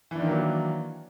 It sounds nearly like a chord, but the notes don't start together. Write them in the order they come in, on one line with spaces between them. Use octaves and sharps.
E3 D4 D#3 A#3 F#3